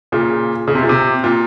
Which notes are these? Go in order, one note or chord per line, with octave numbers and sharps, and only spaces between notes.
A#2 C#3
C#3
C3
A#2
C3
A#2